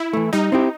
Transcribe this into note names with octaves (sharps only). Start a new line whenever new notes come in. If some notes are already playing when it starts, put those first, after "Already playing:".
Already playing: E4
E3 A3
G3 D#4
C4 E4 G4